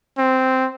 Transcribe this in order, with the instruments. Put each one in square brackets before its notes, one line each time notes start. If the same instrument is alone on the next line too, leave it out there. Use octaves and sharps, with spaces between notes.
[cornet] C4